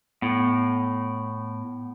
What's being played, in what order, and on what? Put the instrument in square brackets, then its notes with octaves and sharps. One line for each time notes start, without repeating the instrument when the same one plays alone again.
[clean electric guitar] A2 [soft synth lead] B3